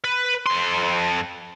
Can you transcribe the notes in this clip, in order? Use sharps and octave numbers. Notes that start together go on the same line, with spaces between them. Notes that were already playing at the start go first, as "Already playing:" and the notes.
B4
F2 C6